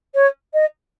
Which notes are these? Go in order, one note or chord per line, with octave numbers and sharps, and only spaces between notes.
C#5
D#5